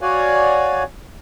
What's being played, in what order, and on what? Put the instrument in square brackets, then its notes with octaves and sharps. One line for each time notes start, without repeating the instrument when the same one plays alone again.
[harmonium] F#4 C#5 D5 F5 F#5 G#5